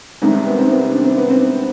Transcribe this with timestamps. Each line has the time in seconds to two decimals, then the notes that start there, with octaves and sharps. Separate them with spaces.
0.22 C2 C3 D#3 G#3
0.45 B3
0.58 C4
0.69 B3
0.92 D4
1.04 C4
1.17 B3
1.30 C4